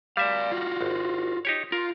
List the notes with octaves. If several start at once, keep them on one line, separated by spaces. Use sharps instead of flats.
G3 D5 E5 F5
F4 F#4
G#1
D#4 G4 C#5
F4 A#4